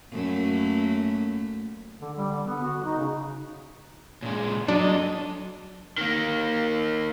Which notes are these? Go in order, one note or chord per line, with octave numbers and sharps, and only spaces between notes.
F#2 A3 A#3
D3
G3
D3
B3
F#4
D#4
C#3
A#2 C#3 G#3
F#3 D4 A4 D5 D#5
D#3 A#3